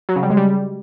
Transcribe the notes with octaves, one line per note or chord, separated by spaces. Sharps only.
F#3
C#3
G3
G#3
G3